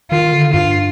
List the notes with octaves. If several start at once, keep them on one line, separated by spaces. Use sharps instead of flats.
D#3 F4
D3
G2 F4